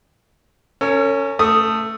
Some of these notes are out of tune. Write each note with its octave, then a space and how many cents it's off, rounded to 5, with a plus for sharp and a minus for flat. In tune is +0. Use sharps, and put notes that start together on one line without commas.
C#4 +0 A#4 -45
A3 +10 D#6 +0